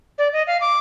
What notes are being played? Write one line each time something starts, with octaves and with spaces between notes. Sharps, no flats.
D5
D#5
F5
D6